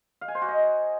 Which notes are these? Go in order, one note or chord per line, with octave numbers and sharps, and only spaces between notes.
F5
G#5
C5
F#4
D#5